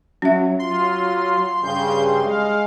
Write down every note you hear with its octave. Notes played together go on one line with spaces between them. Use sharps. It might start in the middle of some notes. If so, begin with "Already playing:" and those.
F#3 C#4 E5
F#3 F4 C6
G2 C#3 G6
G#3 F5